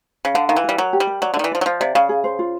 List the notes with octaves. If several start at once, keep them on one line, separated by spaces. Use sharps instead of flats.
C#3
D3 F5
D#3 F5
E3
G3 A#4
F#3 A#4
G4
G3
A#4
F#3 D5
D3
D#3 D5
E3
F3 D5
F#3
F3 F5
C3 D5
C#3 F5
G#4
C5
F4